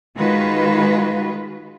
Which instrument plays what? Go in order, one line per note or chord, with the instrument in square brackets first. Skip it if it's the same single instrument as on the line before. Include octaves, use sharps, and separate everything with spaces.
[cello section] D#3 G#3 F4 F#4 B4